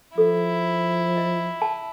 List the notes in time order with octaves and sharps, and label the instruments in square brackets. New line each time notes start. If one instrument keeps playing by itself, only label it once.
[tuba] F3 [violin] E4 [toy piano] A4
[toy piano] D#5
A5